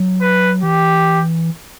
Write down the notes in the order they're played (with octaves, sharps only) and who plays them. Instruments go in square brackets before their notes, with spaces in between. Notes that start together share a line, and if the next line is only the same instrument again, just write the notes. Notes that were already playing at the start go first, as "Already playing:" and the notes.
Already playing: [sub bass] F#3
[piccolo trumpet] B4
[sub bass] E3 [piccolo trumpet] G4